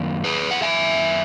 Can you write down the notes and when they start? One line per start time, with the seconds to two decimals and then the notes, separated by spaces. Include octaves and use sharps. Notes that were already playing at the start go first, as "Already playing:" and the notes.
Already playing: F#2 D#3 A#3
0.25 G#4 B4
0.51 F#5
0.62 E5 G#5